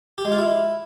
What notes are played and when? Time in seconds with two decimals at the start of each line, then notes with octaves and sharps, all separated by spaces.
0.18 G4
0.25 G#3
0.32 F4
0.38 E4